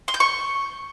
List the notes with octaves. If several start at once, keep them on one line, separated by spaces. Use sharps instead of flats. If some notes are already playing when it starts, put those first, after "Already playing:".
C6
G6
C#6